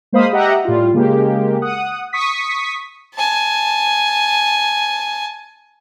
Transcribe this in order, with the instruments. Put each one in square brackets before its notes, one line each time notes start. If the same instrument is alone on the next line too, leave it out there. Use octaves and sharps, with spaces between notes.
[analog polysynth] G#3 A#3 C5 F5 B5 D#6
G4 D#5 E5 F#5 A#5
A2 G3 F4
C#3 G#3 A#3 G4
F#5 D#6
C#6 D#6 B6
[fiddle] G#5 A5